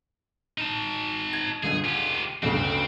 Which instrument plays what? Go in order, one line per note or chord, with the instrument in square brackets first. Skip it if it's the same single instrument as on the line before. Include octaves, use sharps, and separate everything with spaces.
[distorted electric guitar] D#4 A5
[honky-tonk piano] G#6
[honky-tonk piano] C#2 D3 [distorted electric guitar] G#4
[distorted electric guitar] F4 G4
[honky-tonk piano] G1 D2 C#3 [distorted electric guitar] C4